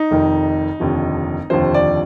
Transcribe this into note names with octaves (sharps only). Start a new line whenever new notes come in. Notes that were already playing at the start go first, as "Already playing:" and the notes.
Already playing: D#4
F1 F2 D#3
F1 D#2 D3 F3
F1 D#2 D3 F3 C5
D5